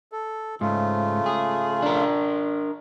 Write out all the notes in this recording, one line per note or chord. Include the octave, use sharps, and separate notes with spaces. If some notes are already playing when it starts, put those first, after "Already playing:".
A4
G#2 C#3 A3 F4
G#4
D4 A#4